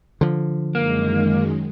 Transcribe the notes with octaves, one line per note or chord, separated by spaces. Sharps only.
D3 F3
F#2 D#3 G#3 A#3